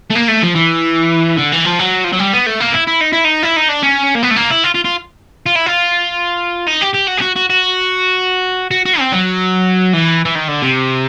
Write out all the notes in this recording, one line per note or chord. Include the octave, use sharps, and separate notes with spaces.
A3
A#3
A3
F3
E3
D3
E3
F3
F#3
F3
F#3
G3
B3
A3
A#3
E4
E4
D#4
E4
D#4
E4
D#4
D4
C#4
A#3
B3
A3
A#3
E4
F4
F4
F4
F4
E4
F4
D#4
G4
G4
F#4
G4
F#4
F#4
F#4
F#4
F#4
C4
F#3
E3
E3
D#3
D3
C3